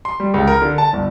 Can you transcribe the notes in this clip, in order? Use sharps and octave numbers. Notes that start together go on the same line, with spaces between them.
C6
G3
C#2
A#4
D3
A5
G1